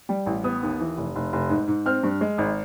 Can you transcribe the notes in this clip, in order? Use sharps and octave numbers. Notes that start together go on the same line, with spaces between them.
G3
A1
B3 D#6
D#2
E3
F1
F1
F1
G#2
G#2
C4 F6
G2
G#3
G#1